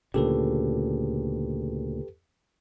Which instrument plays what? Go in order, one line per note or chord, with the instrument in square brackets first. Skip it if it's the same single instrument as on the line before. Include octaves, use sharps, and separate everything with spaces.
[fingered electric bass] D2 A#2 C#3 [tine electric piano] G4 A4 B4